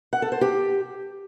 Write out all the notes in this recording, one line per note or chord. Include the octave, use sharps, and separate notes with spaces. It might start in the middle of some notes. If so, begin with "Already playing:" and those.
F#5
A4
C5
G4